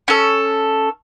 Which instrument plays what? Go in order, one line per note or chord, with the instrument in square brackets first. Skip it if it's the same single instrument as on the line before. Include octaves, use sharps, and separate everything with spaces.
[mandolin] C#4 A4